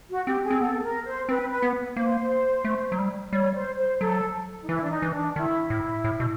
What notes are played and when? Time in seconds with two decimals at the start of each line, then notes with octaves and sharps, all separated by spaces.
0.11 F#4
0.27 C4 G4
0.45 G#4
0.50 C4
0.60 B3 A4
0.79 A4
0.83 A#4
1.06 C5
1.29 C4 B4
1.51 B4
1.62 B3
1.96 A#3 C5
2.65 A3
2.92 F#3
2.98 G3
3.32 G3 C#5
3.55 C5
3.78 C5
4.01 F#3 A4
4.62 D#4
4.68 E3 E4
4.84 D4
4.91 D#4
5.02 E3
5.13 D4
5.36 D#3 E4
5.70 A2
6.04 A2
6.20 B2